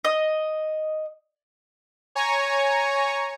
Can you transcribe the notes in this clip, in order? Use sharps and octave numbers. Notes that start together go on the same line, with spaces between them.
D#5
C#5 G#5 A#5 C#6